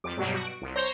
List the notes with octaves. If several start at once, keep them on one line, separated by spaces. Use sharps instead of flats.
F2 D6
G2 B2 F#3 G3
F#4
D7
C2
C5 C#5 A#5 G6 A#6